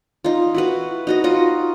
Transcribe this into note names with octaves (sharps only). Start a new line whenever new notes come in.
D#4 F4
E4 F#4 B4
D#4 F#4 D#5
F4 F#4 D#5